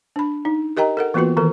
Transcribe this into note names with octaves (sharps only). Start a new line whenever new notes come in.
D4 B5
D#4
G4 A#4 D#5 G5 A#5
A4 A#4 F#5
E3 A#3 B3 F4 F#4 B4
D#3 E3 A4 A#4